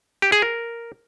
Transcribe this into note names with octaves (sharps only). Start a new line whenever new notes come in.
G4
G#4
A#4